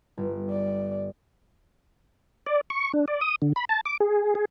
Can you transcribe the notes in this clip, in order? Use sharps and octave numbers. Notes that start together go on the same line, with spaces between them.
G1
D5
D5
C#6
D4
D5
D#6
D3
B5
A5
D6
G#4
G#4